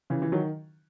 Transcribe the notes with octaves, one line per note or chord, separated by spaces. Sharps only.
C#3 E3
E3
D#3 F#3